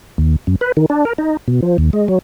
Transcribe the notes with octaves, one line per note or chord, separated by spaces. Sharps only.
D#2
F#2
B4
D#3
D4
A#4
D#4
B2
F3
D#2
G#3
F#3